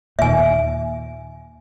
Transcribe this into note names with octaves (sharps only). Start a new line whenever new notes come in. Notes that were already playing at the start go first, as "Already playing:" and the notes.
D#2 A#2 E5 G#5